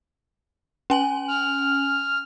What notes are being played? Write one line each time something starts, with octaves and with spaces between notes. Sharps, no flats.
C#4 G#5 F#7
F6